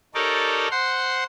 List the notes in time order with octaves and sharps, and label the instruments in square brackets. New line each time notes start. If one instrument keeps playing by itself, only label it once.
[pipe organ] D#4 G4 A4 A#4 C#5 D5
C5 F#5 C6